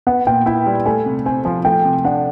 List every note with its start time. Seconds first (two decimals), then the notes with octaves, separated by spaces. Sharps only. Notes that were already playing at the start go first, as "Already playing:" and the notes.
0.07 B3 F#5
0.27 A#2 G5
0.46 E4 G5
0.66 G3
0.86 A3 G#5
1.06 C3
1.26 C4 G#5
1.45 F3 G#5
1.65 A3 G5
1.85 C3
2.04 D4 F#5